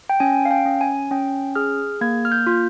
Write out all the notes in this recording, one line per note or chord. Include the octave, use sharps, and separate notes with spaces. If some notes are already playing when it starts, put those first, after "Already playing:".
G5
C#4 G#5
F5
G5
C#4
G#5
C#4 G5
G#4 F6
A#3 G#6
F6
G6
F4